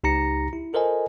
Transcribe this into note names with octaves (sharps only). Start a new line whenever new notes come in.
C#2 D#4 G4 A#5 A#6 C#7
E4
F4 A4 A#4 C5 D#5 G#5